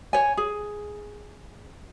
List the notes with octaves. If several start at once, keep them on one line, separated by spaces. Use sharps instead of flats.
C#5 G#5
G#4